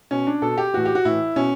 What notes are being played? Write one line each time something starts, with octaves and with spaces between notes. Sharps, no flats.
B2 C#4
D4
B2 A4
G4
A2 E3 F#4
G4
F#4
A2 E3 E4
B2 C#4